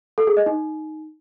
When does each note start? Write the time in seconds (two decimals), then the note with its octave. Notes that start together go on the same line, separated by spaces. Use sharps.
0.18 A4
0.27 G#4
0.37 D#5
0.46 D#4